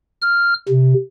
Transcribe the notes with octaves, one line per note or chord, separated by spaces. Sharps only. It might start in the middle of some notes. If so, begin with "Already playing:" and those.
F6
C3